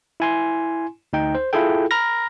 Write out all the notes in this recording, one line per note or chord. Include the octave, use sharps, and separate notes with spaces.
E4 G#5 C6
D2 D#4 G5
C5
E4 F4 G#4 A4 G5
A#5 B5 F6 A#6